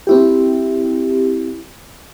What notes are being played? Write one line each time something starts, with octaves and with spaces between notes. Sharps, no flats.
C4 E4 G4